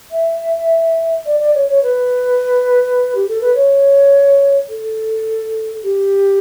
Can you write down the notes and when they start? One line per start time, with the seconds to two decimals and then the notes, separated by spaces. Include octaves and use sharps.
0.11 E5
1.26 D5
1.40 D5
1.54 C#5
1.68 C#5
1.83 B4
3.15 G4
3.28 A4
3.41 B4
3.55 C#5
4.69 A4
5.84 G4